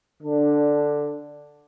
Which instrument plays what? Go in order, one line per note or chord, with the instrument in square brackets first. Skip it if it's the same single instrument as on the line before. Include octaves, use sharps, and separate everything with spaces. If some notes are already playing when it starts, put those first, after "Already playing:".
[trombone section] D3 D4